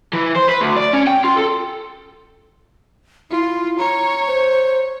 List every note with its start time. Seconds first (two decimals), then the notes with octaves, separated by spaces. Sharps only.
0.13 E3
0.36 C5
0.49 B4
0.61 D2
0.77 D5
0.93 C#4
1.07 G5
1.24 F4
1.36 A4
3.31 E4 F4
3.79 C#5 A#5
4.27 C5